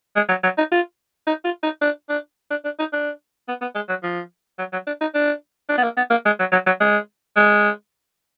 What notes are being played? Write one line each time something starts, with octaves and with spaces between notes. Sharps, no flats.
G#3
F#3
F#3
D#4
F4
D#4
F4
D#4
D4
D4
D4
D4
D#4
D4
B3
B3
G#3
F#3
F3
F#3
F#3
D4
D#4
D4
D4
B3
A#3
B3
A#3
G#3
F#3
F#3
F#3
G#3
G#3